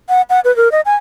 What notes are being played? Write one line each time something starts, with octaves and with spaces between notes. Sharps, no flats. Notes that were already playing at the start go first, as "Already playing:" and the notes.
F#5
F#5
B4
A#4
D#5
G#5